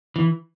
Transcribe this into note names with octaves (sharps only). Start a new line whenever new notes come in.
E3